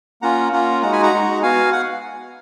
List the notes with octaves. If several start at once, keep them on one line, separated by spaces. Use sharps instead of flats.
A#3 C#4 F4 F#5 A#5
A#3 C#4 F4 F#5 A#5
G#3 D#4 F#4 F#5 A#5
G#5 B5
F#5 A#5
G#3 D#4 F#4
B3 F#4 F5 G#5
F#5